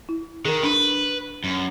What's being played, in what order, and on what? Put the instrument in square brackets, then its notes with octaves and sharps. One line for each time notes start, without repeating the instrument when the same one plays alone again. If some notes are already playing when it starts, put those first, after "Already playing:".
[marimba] E4
[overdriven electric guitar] D#3 [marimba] G#4 A#4
[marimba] D4 [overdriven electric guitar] B4
[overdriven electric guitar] F#2